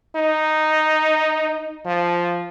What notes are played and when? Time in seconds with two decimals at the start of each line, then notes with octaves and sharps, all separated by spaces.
0.15 D#4
1.85 F3